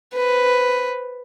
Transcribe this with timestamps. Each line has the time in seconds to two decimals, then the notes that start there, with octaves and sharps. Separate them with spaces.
0.14 B4 C5